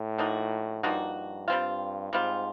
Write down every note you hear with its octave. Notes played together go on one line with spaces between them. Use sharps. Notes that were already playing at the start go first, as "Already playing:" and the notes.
Already playing: A2
F3 A#3 D#4 F#4
G2 F3 A#3 D#4 F#4
G3 C4 F4
G#2 G3 C4 F4